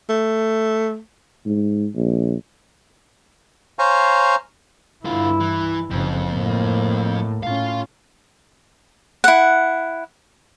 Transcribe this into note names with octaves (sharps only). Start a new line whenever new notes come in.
A3
G#2
A#1
C5 C#5 F5 G#5 A#5 C#6
G2 D3 E4 F4
E3
F#1 F2 C#3
A2 A#3
A2 C#4 F4 F5
E4 F#5